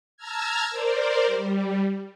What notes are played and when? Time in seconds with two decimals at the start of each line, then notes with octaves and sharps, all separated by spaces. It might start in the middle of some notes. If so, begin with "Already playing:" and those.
0.17 A5 A#5 E6 F6 G#6
0.70 A#4 C5 D5
1.26 G3